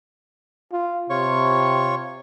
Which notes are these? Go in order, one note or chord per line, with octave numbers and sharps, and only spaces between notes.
F4
C3 F4 C#5 C#6